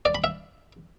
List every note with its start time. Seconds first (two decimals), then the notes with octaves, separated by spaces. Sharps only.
0.05 D5
0.15 B5
0.24 E5